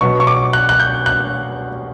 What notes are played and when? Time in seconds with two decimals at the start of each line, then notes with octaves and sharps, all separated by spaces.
0.01 B2 F#3 B3 C#6
0.20 C#6
0.27 D6
0.53 F#6
0.69 F#6
0.80 G6
1.06 F#6